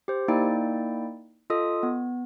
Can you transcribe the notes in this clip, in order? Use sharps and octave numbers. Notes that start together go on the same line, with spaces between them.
G4 C5
A#3 D#4 E4 D5 G5
F4 A4 D#5 D#6
B3